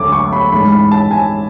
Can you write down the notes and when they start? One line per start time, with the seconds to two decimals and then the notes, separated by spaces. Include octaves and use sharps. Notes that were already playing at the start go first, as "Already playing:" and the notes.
Already playing: D2 D3 F#3 A3 D6
0.12 C#6
0.33 B5
0.52 A1 G#2 G#3 B5
0.72 B5
0.92 A5
1.11 G#5